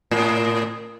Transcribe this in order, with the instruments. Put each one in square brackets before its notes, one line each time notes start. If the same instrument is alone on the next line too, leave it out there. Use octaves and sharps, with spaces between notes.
[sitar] A2